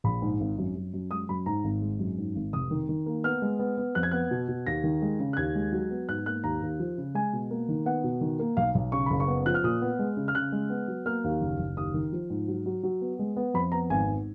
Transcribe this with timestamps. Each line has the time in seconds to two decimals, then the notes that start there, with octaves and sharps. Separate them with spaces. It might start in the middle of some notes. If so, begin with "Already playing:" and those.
0.04 A#1 B5
0.22 G#2
0.40 G#1
0.58 F#2
0.76 F#2
0.94 F#2
1.11 G#3 D#6
1.29 F#2 B5
1.46 G#2 A#5
1.64 G#1
1.82 G#3
1.99 F#2
2.18 G#2
2.35 G#1
2.53 F1 D#6
2.71 D#3
2.89 D#3
3.06 A#3
3.24 B3 F6
3.42 G#3
3.59 B3
3.78 B3
3.95 F2 F#6
4.03 G#6
4.11 B3 F#6
4.31 B2
4.49 B2
4.66 D#2 A#6
4.84 D#3
5.02 G#3
5.20 C#3
5.33 F#6
5.37 D#2 G#6
5.55 G#3
5.73 F#3
5.91 B3
6.08 G#2 F#6
6.26 A#3 F#6
6.44 D#2 A#5
6.62 D#2
6.80 F3
6.98 C#3
7.15 G#3 G#5
7.33 B2
7.51 A#3
7.69 D#3
7.86 B3 F#5
8.04 B2
8.21 D#3
8.39 A#3
8.57 B1 F5
8.75 B1
8.92 C#3 C#6
9.06 F#1 B5
9.20 C#6
9.28 B3
9.46 F3 F#6
9.54 F6
9.64 A#2 D#6
9.82 B3
9.99 G#3
10.17 C#3
10.28 F6
10.35 C#3 F#6
10.52 G#3
10.70 B3
10.88 F#3
11.06 A#3 F6
11.24 D#2
11.41 F#1
11.58 F#1
11.77 D#2 D#6
11.94 D#3
12.12 F3
12.30 G#2
12.48 F#3
12.66 F#3
12.83 F#3
13.01 B3
13.19 G#3
13.37 B3
13.54 F2 B5
13.72 B3 A#5
13.90 G#1 G#5
14.08 G#2